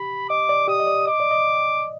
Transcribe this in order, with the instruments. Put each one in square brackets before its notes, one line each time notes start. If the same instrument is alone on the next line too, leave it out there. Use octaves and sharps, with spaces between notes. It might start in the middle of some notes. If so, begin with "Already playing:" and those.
Already playing: [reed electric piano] G4 [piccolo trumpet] B5
[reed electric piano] D#5 [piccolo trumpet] D6
[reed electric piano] D5
[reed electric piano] G4 [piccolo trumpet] D#6
[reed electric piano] D#5
D5
[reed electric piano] D#5 [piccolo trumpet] D6
[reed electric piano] D5
D#5